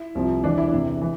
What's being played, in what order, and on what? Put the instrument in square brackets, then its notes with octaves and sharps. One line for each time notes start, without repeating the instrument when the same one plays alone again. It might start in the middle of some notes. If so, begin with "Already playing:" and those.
Already playing: [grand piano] E4
C2 C3 F3
E1 E2 E3 D4
E4
E2 C3 E3
E3